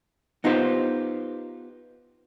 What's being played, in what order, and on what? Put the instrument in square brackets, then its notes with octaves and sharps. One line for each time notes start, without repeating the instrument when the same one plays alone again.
[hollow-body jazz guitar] B3 D#4 F4 G4 C5